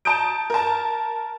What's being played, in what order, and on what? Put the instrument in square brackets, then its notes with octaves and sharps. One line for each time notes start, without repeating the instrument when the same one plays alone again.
[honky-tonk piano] A5 A#5 D#6 G6 D7
A#4 A5